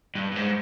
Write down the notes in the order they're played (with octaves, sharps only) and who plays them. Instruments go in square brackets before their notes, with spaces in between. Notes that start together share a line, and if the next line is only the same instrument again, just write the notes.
[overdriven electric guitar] G2
G2
G#2